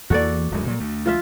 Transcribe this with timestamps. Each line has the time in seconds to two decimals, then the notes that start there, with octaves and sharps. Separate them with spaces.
0.10 E2 E3 A#3 F#4 A4 D5
0.51 D1 F#2 G#3
0.67 A#2 F#3
0.80 D2 A3
1.06 F3 F4 E5